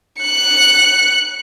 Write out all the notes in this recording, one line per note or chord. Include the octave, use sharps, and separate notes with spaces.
F#6 C#7